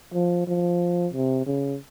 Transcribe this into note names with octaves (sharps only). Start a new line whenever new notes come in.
F3
F3
C3
C#3